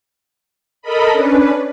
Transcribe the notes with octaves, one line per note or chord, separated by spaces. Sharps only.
A4 A#4 D#5 B5
C#4 D4 B4